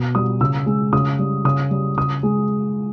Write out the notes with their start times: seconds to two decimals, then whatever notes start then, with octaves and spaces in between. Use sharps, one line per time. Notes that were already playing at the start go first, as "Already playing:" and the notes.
Already playing: B2
0.15 G3 D#6
0.41 C#3 E6
0.66 G#3
0.93 C#3 D#6
1.19 G3
1.45 C#3 D#6
1.71 G3
1.97 C#3 D#6
2.23 G#3